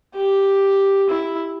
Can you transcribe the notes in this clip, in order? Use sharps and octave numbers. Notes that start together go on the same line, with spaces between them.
G4
E4